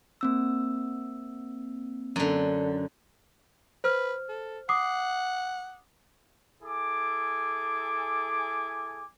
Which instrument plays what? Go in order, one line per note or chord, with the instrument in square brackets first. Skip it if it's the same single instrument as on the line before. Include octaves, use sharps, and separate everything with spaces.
[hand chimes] A#3 C4 E6
[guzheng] F#2 D3
[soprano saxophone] B4 [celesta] C5 F6
[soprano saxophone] A4
[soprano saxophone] F#5 [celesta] D6 D#6 C7
[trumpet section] E4 G#4 A4 G#5 D6